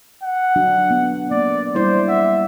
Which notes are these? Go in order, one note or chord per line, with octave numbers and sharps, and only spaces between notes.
F#5
F#3 D4 F#4
B3
A#3 D5
G3 E4 C5 D5
E5 F#5